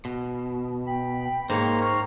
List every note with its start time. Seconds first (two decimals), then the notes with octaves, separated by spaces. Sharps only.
0.05 B2
0.87 G5 B5
1.50 G#2 A#3 C5 C#5 A#5 C6
1.81 A#5 C6 C#6 F6